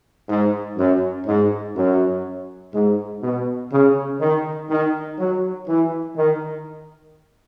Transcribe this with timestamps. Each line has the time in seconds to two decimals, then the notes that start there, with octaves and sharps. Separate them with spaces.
0.29 G#2
0.77 F#2
1.26 G#2
1.75 F#2
2.73 G#2
3.22 B2
3.72 C#3
4.20 D#3
4.69 D#3
5.18 F#3
5.67 E3
6.16 D#3